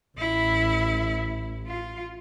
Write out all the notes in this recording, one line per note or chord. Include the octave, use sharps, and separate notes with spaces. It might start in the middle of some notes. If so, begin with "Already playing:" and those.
A1 E4
F4